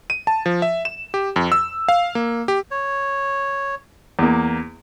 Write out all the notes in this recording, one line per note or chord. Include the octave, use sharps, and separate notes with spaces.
D#7
A5
F3
E5
E7
G4
F2
E6
F5
A#3
G4
C#5
E2 A#3